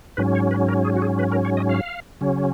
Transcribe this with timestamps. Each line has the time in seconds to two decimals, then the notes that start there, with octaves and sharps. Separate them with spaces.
0.17 G#2 F#3 C#4 B4
0.35 C#5
0.51 B4
0.68 A#4
0.85 G#4
0.96 F#4
1.02 G#4
1.19 B4
1.32 A#4
1.45 C#5
1.57 D#5
1.69 F5
2.21 C#3 F#3 C#4